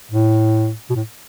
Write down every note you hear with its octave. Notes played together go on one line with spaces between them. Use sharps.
A2
B2
A2